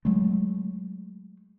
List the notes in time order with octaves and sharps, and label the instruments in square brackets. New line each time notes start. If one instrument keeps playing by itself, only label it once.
[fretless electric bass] F#3 G#3 A3